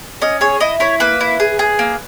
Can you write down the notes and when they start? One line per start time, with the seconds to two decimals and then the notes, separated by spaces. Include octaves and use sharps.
0.22 C#4 D#5
0.41 G#4 C#5
0.60 E4 D#5
0.80 E4 C#5
1.00 A#3 B4
1.21 E4
1.40 G#4
1.59 G#4
1.79 A#3